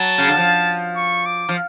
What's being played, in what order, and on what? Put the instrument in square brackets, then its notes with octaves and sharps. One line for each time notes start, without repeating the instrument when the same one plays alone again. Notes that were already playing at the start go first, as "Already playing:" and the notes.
Already playing: [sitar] F#3 [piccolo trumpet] A5
[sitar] C#3
D3
F3
[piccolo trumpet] C#6
D6
[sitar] F3